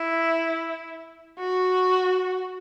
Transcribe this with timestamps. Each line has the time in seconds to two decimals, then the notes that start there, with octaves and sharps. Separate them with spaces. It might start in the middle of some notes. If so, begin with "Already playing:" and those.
Already playing: E4
1.39 F#4